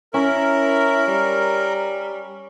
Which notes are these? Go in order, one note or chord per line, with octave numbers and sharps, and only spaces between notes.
C#4 E4 A#4
G3